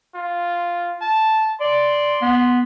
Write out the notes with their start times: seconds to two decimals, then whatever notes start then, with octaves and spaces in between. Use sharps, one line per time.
0.15 F4
1.01 A5
1.61 D5 C6
2.22 B3